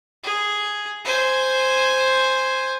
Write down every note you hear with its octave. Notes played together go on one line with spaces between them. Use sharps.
G#4
C5 G#5